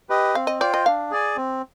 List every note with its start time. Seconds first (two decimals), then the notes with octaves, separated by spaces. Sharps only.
0.10 G4 B4 D#5
0.35 C4 F5
0.47 D#5
0.60 F4 C5 D5 G5
0.74 D#5
0.86 D4 F5
1.11 G#4 D5 G#5
1.36 C4